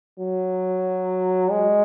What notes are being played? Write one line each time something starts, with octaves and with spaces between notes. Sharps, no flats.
F#3
G#3